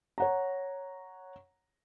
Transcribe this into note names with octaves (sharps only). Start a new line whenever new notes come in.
C#5 F#5 A#5